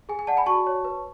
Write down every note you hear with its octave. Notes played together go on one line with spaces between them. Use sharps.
G#4 G#5
G#5
D5 F#5 A5
G#5 B5
F#4 A5 C#6
C#5
B4